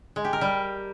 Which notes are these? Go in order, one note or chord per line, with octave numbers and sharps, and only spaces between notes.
G#3
G4
A#4
G3